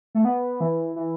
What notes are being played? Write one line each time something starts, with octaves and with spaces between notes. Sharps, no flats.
A3
B3
E3
E3